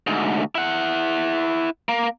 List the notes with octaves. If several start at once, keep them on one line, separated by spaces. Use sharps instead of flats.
D2 G#2
E4 F#5
A#3